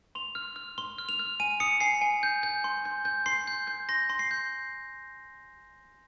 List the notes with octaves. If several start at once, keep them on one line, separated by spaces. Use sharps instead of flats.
C6 F7
F6
F6
C6 G7
F6
F7
F6
G#5 D#7
D#6 C#7
G#5 C7
G#5
G6
G6
C6
G6
G6
C6 C7
G6
G6
C6 A#6
C6
C7
G6